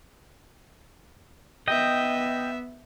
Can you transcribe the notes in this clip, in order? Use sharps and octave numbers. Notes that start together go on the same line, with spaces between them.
B3 D#5 E5 G5